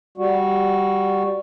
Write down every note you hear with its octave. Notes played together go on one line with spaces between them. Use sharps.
G3 F#4